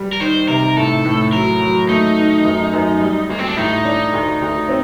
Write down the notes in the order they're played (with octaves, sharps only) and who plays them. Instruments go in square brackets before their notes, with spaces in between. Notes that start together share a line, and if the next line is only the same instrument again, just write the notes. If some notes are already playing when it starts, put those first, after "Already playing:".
Already playing: [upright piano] G3
[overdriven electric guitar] A#4
[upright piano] D#3 [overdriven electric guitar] C5
[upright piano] C3 [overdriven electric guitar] A#4
[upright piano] A2 [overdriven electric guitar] A4
[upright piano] A2
[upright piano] F#3 [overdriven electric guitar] A#4
[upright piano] F#3
[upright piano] A3 [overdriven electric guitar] D#4
[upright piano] D#3
F#2
F#2
G3
[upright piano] D2 [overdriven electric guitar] A#3
[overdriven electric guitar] C4
D4
[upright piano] A2 [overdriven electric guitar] D#4
[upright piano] D4
D2
D2
C4